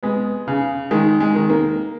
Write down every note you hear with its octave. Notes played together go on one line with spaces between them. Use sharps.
G#3 B3
C#3
D#3 G#3
G#3
D#3
A#3